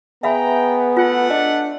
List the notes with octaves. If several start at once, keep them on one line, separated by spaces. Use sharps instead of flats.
B3 G#4 E5 F5 G5 A#5 B5
A3 F4 F#5
D4 D#5